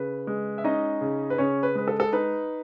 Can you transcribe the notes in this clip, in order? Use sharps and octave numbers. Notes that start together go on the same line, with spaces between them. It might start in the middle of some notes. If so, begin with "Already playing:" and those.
Already playing: C#3 B4
G#3
E5
C#4 D#4 D#5
C#3
B4
C#3 C#4 C#5
B4
G#3 B4
A4
A4
D#4 B4